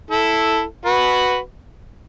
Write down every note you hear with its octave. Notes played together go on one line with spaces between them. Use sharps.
E4 A4
F#4 B4